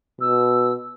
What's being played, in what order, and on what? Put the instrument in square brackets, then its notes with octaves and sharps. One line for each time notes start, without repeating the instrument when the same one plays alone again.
[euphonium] B2 [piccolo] E6